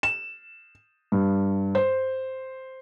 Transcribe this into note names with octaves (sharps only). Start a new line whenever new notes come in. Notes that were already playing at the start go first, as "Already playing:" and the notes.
E7
G2
C5